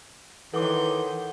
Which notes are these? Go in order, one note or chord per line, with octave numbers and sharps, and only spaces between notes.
D#3 E3 A4 C#5 F#5 C6 D6 G6